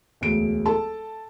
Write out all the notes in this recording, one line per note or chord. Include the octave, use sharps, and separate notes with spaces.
E1 D2 D7
A4 A5